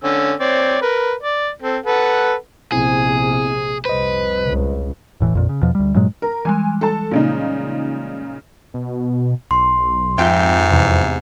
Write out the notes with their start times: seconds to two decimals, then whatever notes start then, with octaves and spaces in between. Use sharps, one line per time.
0.04 D3 C#4 E6
0.40 C4 C#5 D5
0.82 A#4 B4
1.23 D5
1.62 C4 A4
1.86 A4 B4 F#5
2.72 A#1 C3 B3 C4 E4 G#4
3.85 F1 C2 B4 C5 D#5
4.48 C#2
5.20 E1 A2 E3
5.33 A1 F2 A#2
5.49 C#3
5.62 E2 B2 F3
5.75 D2 G3
5.95 G2 A#2 F#3 G#3
6.22 A#4
6.45 E3 G3 G#3 G#5
6.81 A4 A5
7.11 A#2 C#3 D#4
8.74 B2
9.51 B1 C6
10.18 F2 G#2 F4 E5 G5
10.72 E2 C3